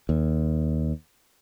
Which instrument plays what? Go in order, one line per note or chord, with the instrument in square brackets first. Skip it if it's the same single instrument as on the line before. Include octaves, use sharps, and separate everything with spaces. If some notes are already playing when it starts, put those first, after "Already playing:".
[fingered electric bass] D#2